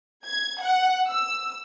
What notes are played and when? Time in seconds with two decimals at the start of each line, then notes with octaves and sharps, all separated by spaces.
0.25 G#6
0.62 F#5
1.08 E6